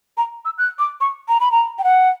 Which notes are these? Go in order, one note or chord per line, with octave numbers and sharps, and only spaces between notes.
A#5
E6
F#6
D6
C#6
A#5
B5
A#5
G5
F#5